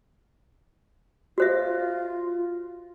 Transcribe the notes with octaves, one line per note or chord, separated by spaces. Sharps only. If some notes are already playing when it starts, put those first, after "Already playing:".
F4 F#4 C5 E5